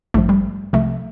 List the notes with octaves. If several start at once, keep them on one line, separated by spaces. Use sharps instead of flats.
A1 G2 F3 A3
G3
C2 C3 F3 A3